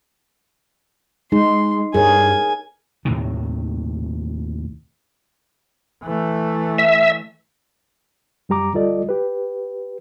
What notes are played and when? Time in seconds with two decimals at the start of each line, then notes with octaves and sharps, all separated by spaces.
1.32 G#3 D#4 C6
1.94 G2 G#4 A#4 C#5 G#5
3.05 D#2 A2 C3 D#3
6.03 E3 A3
6.78 E5
8.49 F#2 G3 G4 A#5 D6
8.73 D2 G3 F4 A4 D5 D#5
9.09 G4 B4